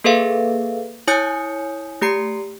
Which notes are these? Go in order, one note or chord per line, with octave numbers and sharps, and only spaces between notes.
A#3 G#4 A4 B4 E5 F5
E4 C#5 G#5 D#6 G6 C#7
A3 G4 A#5 C7